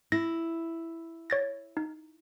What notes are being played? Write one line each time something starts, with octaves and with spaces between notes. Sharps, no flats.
E4 A#6
C#5 A6 A#6
D#4